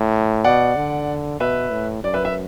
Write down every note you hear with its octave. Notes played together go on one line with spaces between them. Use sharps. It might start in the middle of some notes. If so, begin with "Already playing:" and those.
Already playing: A2
B2 D5 F#5
D3
B2 B4 E5
A2
F#2 D5
B4 E5
B4 E5